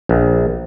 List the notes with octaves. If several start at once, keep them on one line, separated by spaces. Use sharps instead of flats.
A#1